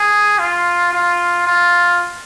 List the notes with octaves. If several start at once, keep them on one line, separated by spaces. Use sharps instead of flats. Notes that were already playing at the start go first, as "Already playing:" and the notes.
Already playing: G#4
F4
F4
F4